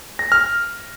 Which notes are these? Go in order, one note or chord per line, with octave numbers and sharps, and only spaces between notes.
A#6
F6